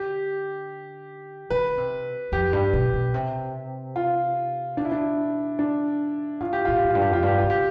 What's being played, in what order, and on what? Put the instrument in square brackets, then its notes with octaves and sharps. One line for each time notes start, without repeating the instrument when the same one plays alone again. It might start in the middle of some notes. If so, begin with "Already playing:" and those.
Already playing: [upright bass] D3 [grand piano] G4
[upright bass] D3 [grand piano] B4
[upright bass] C3
[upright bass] F2 [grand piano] G4
[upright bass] G2
B2
B2
C3
[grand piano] F4
[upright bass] B2 [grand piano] D4
[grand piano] E4
D4
D4
[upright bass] A2 [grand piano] F4
[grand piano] G4
[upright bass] A2 [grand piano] F4
[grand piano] G4
[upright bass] F2
[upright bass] G2 [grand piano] F4
[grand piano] G4
[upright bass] F2 [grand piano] F4
[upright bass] G2 [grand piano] G4
[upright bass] C3 [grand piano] F4
[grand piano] G4